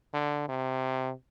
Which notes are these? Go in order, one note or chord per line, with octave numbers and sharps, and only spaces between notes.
D3
C3